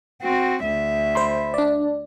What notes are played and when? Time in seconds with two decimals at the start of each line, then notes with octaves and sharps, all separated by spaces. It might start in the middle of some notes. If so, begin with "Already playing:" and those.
0.22 C4 F#4
0.64 D2 E5
1.15 C5 B5 C6
1.54 D4 D5